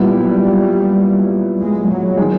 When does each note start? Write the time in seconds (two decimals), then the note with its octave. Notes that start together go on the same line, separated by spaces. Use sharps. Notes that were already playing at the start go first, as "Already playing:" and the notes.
Already playing: A#2 F#3 G3 B3 E4
1.60 G#3
1.89 F#3
2.17 D#3 G#3